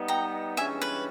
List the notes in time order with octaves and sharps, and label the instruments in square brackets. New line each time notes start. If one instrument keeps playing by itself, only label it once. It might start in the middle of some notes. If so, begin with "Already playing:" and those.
Already playing: [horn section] G3 B3 D#4
[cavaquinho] G5 A#5
[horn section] G2 E3 G#3 C#4 [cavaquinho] E5 G#5
[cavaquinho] B4